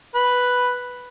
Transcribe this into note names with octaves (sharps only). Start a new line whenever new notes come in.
B4